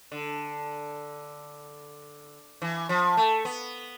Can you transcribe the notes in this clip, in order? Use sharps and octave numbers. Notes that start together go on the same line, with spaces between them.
D3
E3
F3
A3
B3